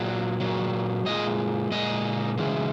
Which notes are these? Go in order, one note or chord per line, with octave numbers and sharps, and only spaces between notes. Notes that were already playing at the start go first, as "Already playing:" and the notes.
Already playing: A#2 F#3
A#2 F#3
A#2 G#3 D#5
A#2 G#3 D#5
C#3 E3 G#3